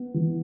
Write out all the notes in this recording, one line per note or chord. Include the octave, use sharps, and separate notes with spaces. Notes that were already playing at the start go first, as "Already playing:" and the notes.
Already playing: B3
E3